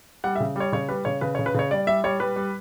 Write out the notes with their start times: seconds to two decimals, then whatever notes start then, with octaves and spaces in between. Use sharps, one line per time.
0.24 G3 F#5
0.35 E5
0.40 C#3
0.56 G3 C#5
0.72 C#3 C#5
0.89 G3 B4
1.05 C#3 C#5
1.21 C#3 B4
1.35 C#5
1.39 C#3
1.46 B4
1.54 C#3 C#5
1.71 G3 D5
1.87 G3 E5
2.04 G3 C#5
2.20 G3 B4
2.36 G3